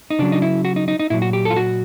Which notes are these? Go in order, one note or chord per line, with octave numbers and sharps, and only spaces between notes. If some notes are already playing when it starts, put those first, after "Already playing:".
D#4
C#3 F#3 D4
D#4
E4
F#4
D#4
D#4
D#4
A#2 F#3 E4
F#4
G4
A4
F4
F#4